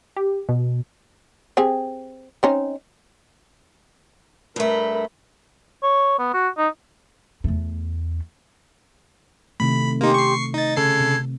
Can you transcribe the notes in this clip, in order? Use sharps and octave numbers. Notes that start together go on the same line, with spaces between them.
G4
B2
C4 G4 G#4
C4 C#4 D#4
G2 A3 A#4 B5
C#5
B3
F#4
D#4
E2 A3
C3 D#3 A3 B5
A#3 C#4 D#4 G4 C6
C#6 C7
D#4 D#5 A6
C#3 A4 G#6 C7
C3